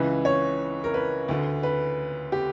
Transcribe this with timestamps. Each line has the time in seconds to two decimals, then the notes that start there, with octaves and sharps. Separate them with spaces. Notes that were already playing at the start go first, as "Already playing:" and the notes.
Already playing: C#2 C#3 E3 B4
0.25 C#5
0.84 A#4
0.94 B4
1.28 D2 D3
1.63 B4
2.32 G4